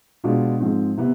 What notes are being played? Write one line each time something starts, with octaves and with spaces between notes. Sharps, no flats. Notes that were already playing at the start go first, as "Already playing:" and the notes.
B2 G#3 D4 F4
G#2 F3 G#3 C4
C3 E3 B3